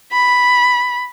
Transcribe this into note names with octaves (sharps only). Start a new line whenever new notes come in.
B5